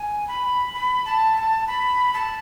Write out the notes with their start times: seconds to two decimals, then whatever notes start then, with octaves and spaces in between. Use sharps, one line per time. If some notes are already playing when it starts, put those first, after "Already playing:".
Already playing: G#5
0.28 B5
0.74 B5
1.05 A5
1.36 A5
1.67 B5
2.14 A5